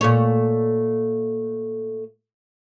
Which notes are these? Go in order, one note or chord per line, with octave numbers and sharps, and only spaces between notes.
A#2 A3 C#5